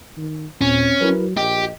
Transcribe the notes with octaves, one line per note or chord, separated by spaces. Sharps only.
D#3
D#2 A#2 C4 C#4
F#3 E4 A#4 B4
A#1 G4 D#5